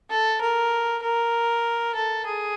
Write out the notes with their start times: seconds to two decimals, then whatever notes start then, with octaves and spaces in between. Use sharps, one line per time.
0.10 A4
0.41 A#4
1.03 A#4
1.95 A4
2.26 G#4